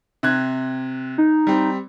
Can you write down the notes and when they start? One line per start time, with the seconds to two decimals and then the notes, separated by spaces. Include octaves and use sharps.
0.23 C3 F#6 G#6
1.18 D#4
1.47 G3 C4